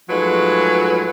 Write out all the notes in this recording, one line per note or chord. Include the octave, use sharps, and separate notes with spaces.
G#2 F3 F#3 G#3 A3 B4